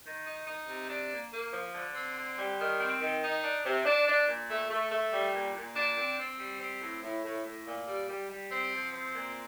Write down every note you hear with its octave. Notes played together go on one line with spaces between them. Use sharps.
D#3
D#4
D#4
C3
D4
A#3
A#3
F3
D3
C4
D3
G3
D#3
C4
D#3
D#4
D4
C3
D4
D4
A#2
A3
A3
A3
G3
A#2
A#2
D4
C4
C4
G3
C4
A2
A2
A2
A2
A#2
G3
G3
G3
C4
F3
C4
A#2